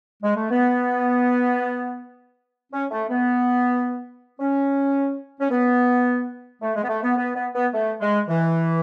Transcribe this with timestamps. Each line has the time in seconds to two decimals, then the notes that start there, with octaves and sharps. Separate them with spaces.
0.23 G#3
0.36 A3
0.50 B3
2.72 C#4
2.91 A3
3.09 B3
4.39 C#4
5.40 C#4
5.50 B3
6.62 A3
6.75 G#3
6.83 B3
6.89 A3
7.03 B3
7.17 B3
7.35 B3
7.54 B3
7.73 A3
8.00 G#3
8.28 E3